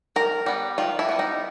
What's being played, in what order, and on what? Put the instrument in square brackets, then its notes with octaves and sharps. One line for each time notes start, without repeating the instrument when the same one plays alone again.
[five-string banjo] D#3 A#4
G3 B3
D#3 F4
E4
G3 B3
D#4